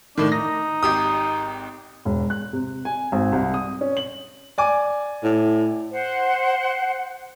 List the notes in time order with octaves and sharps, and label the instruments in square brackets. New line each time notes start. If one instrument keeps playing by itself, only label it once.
[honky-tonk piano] A2 D#3 [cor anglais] D4
[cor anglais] D#4 [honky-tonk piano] A#6
[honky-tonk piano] G#1 G4 D#6
[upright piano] E1
F#6
C3
G#5
G#1
C2
D#6
C#4
F#7
D5 G#5 D6
[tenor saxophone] A2
[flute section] C5 F#5